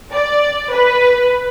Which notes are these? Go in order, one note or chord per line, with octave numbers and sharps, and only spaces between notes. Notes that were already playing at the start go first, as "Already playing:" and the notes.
D5
B4